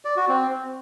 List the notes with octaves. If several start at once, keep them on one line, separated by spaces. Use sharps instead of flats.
D5
F#4
C4